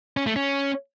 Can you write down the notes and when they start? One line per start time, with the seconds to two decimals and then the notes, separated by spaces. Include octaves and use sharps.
0.17 C#4
0.26 A3
0.36 C#4